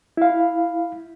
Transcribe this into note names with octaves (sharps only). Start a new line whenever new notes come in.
E4 F5